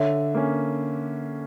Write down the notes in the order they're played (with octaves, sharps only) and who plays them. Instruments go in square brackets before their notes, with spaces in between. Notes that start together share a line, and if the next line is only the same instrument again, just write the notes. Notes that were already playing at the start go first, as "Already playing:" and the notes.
Already playing: [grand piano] D3 [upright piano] C#5 E5
[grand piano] A#3 C#4